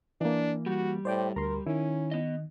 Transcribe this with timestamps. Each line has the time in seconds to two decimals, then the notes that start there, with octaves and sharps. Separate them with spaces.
0.21 E3 A#3 D4
0.66 G3 F#4
1.05 A2 C5 D5 G5
1.36 D2 A#4 A#5 C6
1.67 D#3 C#4 E4
2.11 B3 D#5